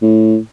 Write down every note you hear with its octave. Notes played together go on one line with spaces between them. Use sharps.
A2